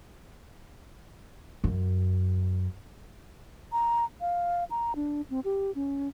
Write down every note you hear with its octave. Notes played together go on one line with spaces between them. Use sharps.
F#2
A#5
F5
A#5
D4
C4
G4
C#4